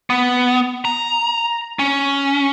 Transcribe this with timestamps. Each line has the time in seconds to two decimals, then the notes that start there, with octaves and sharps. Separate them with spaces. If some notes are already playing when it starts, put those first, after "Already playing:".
0.10 B3
0.85 A#5
1.79 C#4